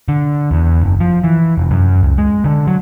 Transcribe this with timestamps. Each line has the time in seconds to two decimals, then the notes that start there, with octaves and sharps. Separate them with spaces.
0.08 D3
0.51 E2
0.82 F#1
1.00 F3
1.24 E3
1.58 F1
1.71 F#2
2.03 C#2
2.18 G#3
2.44 D3
2.67 F#3